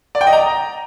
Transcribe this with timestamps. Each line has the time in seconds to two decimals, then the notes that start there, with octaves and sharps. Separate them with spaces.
0.15 D5
0.21 G5
0.27 D#5
0.33 A#5